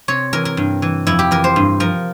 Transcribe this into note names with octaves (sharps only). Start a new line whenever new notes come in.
C3 C#5
E3 A#4
A#4
G2
E3
F2 E4
G4
E3 A#4
C5
G2
F3 A#4